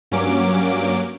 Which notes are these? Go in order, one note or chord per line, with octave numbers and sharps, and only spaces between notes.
G2 F#3 A#3 C#4 D6 D7